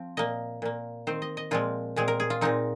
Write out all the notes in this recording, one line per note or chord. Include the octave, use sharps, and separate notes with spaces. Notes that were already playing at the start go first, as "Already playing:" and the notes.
Already playing: F3 C4
A#2 A#3 D#5
A#2 A#3
D#3 C4 C5
D#5
D#5
A#2 F3 G#3 C4 F4
A#2 G#3 C4 G#4
A#4
G#4
F4
A#2 G#3 C4 D#4